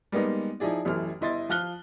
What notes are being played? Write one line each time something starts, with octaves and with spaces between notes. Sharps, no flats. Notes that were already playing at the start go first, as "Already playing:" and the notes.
G3 G#3 A#3 B3 D#4
F3 D#4 E4 G#4 D5
A1 F#2 E3 A3 F6
G1 E4 D#5 C6 A6
F3 F4 F6 F#6 G7